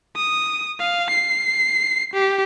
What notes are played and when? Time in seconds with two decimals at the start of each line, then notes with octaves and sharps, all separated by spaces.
0.16 D#6
0.80 F5
1.10 C7
2.13 G4